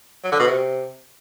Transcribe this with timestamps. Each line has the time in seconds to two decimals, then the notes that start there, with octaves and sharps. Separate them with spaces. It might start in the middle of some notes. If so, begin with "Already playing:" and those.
0.24 F#3
0.32 D3
0.40 B2
0.47 C3